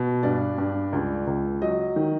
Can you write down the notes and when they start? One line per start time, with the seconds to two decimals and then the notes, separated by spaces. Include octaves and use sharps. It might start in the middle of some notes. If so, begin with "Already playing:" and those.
Already playing: B2
0.23 G2 D5
0.58 G2
0.93 C#2
1.27 C#2
1.62 F#3 D#5
1.96 D#3